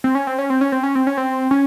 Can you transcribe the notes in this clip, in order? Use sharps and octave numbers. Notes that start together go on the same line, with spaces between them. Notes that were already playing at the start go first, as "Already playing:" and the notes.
C4
C#4
C4
C#4
C4
C#4
C4
C#4
C4
C#4
C4
C#4